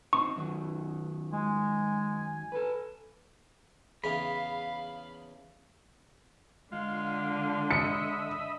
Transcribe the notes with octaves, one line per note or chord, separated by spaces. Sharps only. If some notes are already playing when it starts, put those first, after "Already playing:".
C4 D#4 C#6
F#2 D#3 F#3
G#3 G#5
A4 B4
E2 C#3 D#4 F5 B5
D3 G#3 F4 F5
D#5 E5 B5 C#7